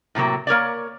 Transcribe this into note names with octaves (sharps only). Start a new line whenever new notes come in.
A2 C3 F#3 A#3
A#3 A#4 C#5 D5